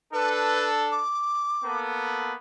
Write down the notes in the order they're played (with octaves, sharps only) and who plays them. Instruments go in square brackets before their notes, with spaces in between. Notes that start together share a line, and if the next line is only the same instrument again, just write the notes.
[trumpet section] D4 A4 [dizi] B4
[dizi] D6
[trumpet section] A#3 B3 A4